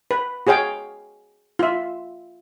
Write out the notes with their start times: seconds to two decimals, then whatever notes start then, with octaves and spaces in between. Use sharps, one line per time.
0.11 B4
0.47 F#4 G#4 C#5 F5 G5
1.59 F4 E5